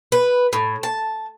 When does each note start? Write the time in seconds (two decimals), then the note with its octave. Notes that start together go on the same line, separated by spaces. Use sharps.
0.12 B4
0.53 A2
0.83 A5